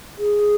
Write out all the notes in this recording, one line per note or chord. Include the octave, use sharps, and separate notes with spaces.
G#4